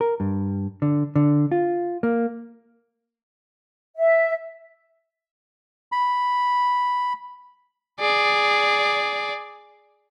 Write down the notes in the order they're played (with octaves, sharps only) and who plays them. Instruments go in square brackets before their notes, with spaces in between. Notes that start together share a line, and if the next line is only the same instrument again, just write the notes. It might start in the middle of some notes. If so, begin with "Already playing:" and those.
[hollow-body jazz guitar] A#4
G2
D3
D3
F4
A#3
[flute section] E5
[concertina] B5
[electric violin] G#4 D5